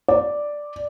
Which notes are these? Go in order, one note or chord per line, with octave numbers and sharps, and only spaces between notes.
D5